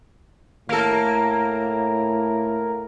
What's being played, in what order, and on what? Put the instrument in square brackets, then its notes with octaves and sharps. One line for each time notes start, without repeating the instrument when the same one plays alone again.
[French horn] A2 [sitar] A#3 A4 [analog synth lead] A#4